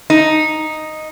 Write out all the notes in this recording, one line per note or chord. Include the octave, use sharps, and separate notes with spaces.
D#4